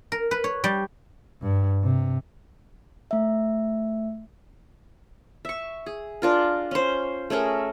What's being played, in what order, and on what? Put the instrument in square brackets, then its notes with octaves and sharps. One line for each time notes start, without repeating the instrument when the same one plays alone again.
[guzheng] A#4
B4
C#5
G3
[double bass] G2
C3
[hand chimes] A3 E5
[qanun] E5 C#6
G#4
D4 F4 A#4
C#4 C5
A3 C#4 G#4 A#4